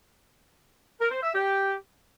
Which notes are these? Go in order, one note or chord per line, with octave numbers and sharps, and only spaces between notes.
A#4
C5
E5
G4